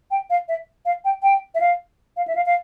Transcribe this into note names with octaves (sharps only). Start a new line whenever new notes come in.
G5
F5
E5
F5
G5
G5
E5
F5
F5
E5
F5
F5